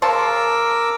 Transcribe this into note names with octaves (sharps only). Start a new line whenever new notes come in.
C#3 A#4 A5 C6 D6 E6